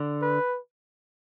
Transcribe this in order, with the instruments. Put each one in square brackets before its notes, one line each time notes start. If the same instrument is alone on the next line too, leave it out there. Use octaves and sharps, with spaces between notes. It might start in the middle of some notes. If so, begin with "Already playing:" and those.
Already playing: [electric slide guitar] D3
[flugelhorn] B4